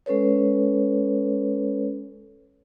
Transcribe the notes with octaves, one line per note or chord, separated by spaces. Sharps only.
G#3 C#4 A4 B4 C#5